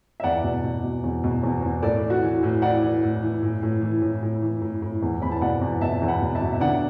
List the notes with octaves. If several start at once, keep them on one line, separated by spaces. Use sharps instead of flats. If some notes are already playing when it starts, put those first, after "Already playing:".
E5
E2 D5 F#5
B2
B2
B2
E2
B2
E2
E2
A2 A4 D5
E3
F#4
E3
A2
E3 D5 F#5
E3
A2
E3
A2
A2
E3
A2
A2
E3
A2
A2
E2
E2 B5
A5
B2 D5 F#5
E2
B2 E5 A5
E2
F#5 B5
B2
E5 A5
B2
E5
D3 D5 F#5